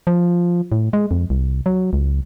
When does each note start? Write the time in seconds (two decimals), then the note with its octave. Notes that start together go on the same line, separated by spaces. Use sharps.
0.07 F3
0.72 A2
0.93 G#3
1.11 F2
1.30 C2
1.66 F#3
1.93 C#2